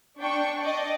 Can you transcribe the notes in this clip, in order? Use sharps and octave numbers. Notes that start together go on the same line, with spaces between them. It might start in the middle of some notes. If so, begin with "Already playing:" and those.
D4 G5 C#6
D5 D#5